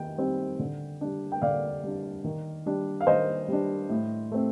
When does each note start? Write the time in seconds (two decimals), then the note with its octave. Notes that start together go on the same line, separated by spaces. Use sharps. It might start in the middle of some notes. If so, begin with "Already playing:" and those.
Already playing: D#3 D#4 G5
0.18 G3 C4 D#4
0.60 D3
1.01 G3 D4
1.32 G5
1.42 D3 D5 F5
1.83 G3 D4
2.24 D#3
2.66 G3 D4
3.01 F5
3.07 D#3 C5 D#5
3.48 G3 D4
3.89 A2
4.32 A3 C4